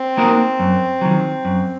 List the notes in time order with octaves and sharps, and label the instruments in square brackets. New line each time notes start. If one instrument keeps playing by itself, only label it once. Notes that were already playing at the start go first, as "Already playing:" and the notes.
Already playing: [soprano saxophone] C4
[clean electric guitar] A#3 D#4 F#4 A#4
F#2
D#3 F#3
F#2